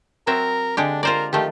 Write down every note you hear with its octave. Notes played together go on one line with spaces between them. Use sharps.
F#3 C4 A#4 E5
D3 G#3 D4 G4
F4 A#4 C5 D5
D#3 F3 A3 G4